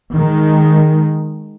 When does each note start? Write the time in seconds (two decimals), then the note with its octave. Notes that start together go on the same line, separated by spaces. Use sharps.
0.15 D#3 G#3